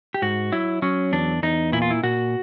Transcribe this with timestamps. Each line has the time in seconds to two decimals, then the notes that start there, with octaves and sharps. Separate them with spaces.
0.14 G4
0.22 G#2 F#4
0.52 F#3 E4
0.82 F#3 C#4
1.12 E2 D4
1.43 E2 D#4
1.72 A#2 E4
1.82 F4
1.90 E4
2.03 A#2 F#4